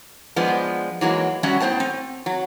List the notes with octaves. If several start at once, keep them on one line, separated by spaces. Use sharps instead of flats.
F3 G#3 B3 D4
E3 F#3 G#3 A#3
F#3 G3 C#4 F#4 E5
A2 B3 C5 G5 A5
C4
F#3